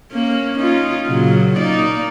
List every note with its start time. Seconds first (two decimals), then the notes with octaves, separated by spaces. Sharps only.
0.12 A#3 C#4
0.59 C#4 D#4 F4
1.07 A#2 C#3 F#3
1.59 A#3 D#4 D5